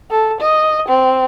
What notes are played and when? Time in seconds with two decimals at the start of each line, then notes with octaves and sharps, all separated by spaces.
0.10 A4
0.40 D#5
0.88 C4